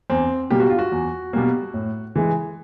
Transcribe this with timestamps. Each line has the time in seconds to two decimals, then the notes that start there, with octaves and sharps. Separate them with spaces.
0.10 E2 C4
0.51 B2 G3 A#3 G4
0.60 F#4
0.70 F4
0.79 F#4
0.92 E2
1.33 B2 G3 A#3
1.74 A2
2.16 E3 G#3